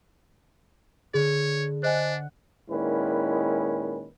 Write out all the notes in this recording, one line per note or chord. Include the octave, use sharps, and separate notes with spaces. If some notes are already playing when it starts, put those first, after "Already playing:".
D3 G#4 C#5
D4 C5 D#5 F#5 G#5 F#6
A#2 D#3 G#3 C#4 E4 B4